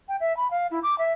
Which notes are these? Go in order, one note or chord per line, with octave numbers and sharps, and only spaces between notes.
G5
E5
B5
F5
E4
D6
E5